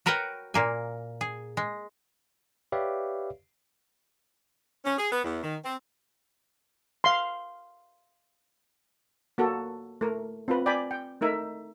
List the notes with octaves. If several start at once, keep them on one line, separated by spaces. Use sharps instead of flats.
F#4 A#4 B4 C#5 F#5 G5
A#2 A#3 G#5
G#4
G#3
G4 B4 C#5 D5 E5 F5
C#4
G#4
B3
E2
D#3
C4
F5 C6
A#3 F#4 A4
A3 A#4
C4 F4 B4
D5 G5 G#5 B5
G5
A3 D#4 A#4 E5